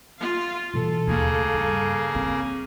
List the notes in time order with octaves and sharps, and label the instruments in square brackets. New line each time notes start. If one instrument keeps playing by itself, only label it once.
[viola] F4 F5
[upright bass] B2 E3 [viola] A4
[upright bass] D#2 A3 [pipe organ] C#3 A#3 G#4
[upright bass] G2
C4